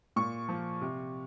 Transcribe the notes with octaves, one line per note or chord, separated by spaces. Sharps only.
A#2 C#6
F3
C3